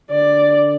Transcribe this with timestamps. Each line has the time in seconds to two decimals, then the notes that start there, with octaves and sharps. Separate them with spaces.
0.10 D3 D5